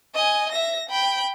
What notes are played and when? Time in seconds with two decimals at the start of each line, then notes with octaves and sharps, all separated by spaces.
0.15 D#5 G#5
0.52 E5 A#6
0.90 G5 B5